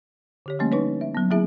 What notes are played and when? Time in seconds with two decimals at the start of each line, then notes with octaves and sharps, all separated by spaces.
0.46 D3 G4 C#5
0.59 F3 G3 A3 A#3 C#4
0.72 D4 D#4 B4 C#5
1.01 E5
1.15 F#3 B3
1.31 F#3 A#3 C4 E4 G#4 E5